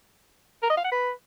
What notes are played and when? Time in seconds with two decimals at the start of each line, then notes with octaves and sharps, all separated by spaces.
0.63 A#4
0.70 D#5
0.77 F5
0.84 F#5
0.92 B4